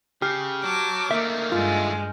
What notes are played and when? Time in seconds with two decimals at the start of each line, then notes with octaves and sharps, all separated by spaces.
0.22 C#3 G4 F6 G6
0.64 F#3 A5 D6
1.11 D#3 A3 A#3 E5
1.52 G2 G#3 F4